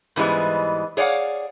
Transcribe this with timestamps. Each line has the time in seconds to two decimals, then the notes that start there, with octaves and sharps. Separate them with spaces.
0.16 G#2 E3 G3 G#3 B3
0.97 G#4 C#5 D5 F5 F#5